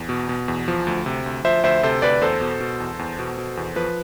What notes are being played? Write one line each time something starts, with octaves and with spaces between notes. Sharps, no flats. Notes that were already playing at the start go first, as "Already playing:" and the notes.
Already playing: E2
B2
B2
E2
F3
D2
C3
D2
F3 C5 E5
D2 C5 E5
C3 A4 C5
D2 B4 D5
E2 A4 C5
B2
B2
E2
E2
B2
B2
E2
F3 B4